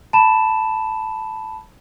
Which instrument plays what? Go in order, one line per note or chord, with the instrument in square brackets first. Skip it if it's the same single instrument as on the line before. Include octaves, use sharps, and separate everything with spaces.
[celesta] A5 B5 E7